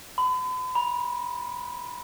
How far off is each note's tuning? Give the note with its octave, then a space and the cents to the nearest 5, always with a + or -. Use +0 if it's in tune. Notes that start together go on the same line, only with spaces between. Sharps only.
B5 +40
B5 -35